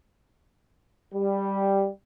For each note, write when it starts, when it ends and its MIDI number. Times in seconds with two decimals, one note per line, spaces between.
1.14 1.87 55